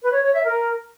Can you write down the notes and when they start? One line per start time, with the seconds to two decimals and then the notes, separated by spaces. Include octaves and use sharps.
0.02 B4
0.13 C#5
0.23 C#5
0.33 E5
0.44 A#4